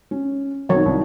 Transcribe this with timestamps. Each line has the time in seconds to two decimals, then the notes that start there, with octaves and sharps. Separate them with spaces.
0.11 C#4
0.69 B1 D#3 F#3 C4 C#5
0.83 C2 D#4